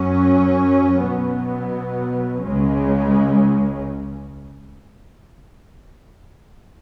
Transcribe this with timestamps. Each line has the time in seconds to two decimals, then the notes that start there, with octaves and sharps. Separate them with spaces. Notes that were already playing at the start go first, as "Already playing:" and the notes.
Already playing: F#2 F#3 C#4
1.04 B2 F#3 B3
2.43 C#2 C#3 G#3 C#4